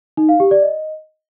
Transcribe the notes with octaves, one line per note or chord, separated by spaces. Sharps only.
D#4
F5
G4
D5
D#5